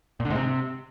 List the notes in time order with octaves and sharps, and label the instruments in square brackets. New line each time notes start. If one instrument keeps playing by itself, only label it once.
[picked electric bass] A#2
D3
G#2
C3